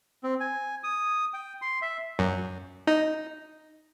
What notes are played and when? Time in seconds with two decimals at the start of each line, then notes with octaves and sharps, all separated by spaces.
0.24 C4
0.40 G#5
0.83 D#6
1.34 G5
1.62 C6
1.82 E5
2.19 F#2
2.87 D#4